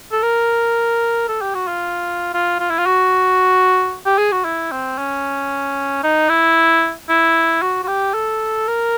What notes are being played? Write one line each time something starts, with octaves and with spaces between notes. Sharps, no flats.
A4
A#4
A4
G4
F#4
F4
F4
F4
E4
F4
F#4
G4
G#4
F#4
E4
C4
C#4
D#4
E4
E4
F#4
F#4
G4
A4
A#4